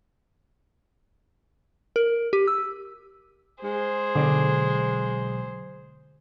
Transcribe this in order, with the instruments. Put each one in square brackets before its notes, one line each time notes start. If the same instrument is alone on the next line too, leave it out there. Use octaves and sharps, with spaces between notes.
[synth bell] A#4
G4
E6
[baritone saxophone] G#3 [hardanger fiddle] G#4 C5
[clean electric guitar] B1 B2 D5 [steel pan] D3